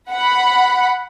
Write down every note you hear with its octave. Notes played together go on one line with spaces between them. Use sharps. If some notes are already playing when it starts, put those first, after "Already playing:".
F#5 B5